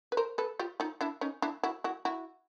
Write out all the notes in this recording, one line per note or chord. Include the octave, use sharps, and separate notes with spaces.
B4
A#4 C5
A4 B4
F4 G4
D#4 F4
D4 E4
C#4 D#4
D4 E4
E4 F#4
E4 F#4
E4 F#4